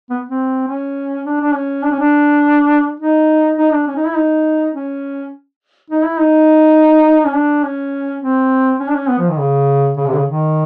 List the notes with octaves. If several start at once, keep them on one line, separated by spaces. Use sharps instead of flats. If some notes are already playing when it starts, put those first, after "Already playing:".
B3
C4
C#4
D4
D4
C#4
D4
C#4
D4
D#4
D#4
D4
C#4
D#4
E4
D#4
C#4
D#4
E4
D#4
C#4
D4
C#4
C4
C#4
D4
C#4
B3
F3
D#3
C#3
C#3
C3
D3
C#3
D#3